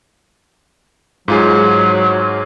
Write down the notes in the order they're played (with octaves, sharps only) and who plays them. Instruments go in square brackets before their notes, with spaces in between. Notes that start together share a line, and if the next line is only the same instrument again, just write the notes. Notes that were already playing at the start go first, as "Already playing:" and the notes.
[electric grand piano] G#2 F4 G#4 [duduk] F#3